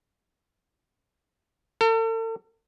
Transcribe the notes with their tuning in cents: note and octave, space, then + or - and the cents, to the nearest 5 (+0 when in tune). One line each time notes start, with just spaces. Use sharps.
A4 +40